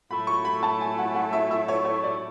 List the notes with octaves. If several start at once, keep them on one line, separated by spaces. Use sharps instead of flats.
A2 F#3 A3 E4 B5
C#6
B5
A5
G#5
F#5
F#5
E5
E5
C#5
C#5
D5